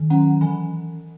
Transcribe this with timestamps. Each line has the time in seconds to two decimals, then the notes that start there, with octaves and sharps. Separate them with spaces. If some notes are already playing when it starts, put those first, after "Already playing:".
Already playing: D#3
0.10 F#3 C#4 F#5 A#5
0.41 E3 G#5 B5